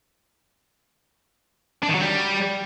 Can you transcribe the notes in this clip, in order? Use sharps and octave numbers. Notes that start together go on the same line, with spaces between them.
D4
D#3
F#3
G3